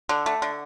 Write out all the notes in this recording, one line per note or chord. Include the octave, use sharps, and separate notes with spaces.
D3
A3
D3